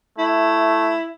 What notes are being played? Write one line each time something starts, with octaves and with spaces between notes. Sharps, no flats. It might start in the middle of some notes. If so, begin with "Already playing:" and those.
A3 E4